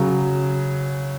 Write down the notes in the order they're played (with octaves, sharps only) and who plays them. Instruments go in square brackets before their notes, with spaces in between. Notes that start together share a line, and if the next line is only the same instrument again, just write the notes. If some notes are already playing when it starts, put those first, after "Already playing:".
Already playing: [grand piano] C#3 F#3